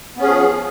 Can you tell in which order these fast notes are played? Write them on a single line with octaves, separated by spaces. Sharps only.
B3 C#4 G#4 F3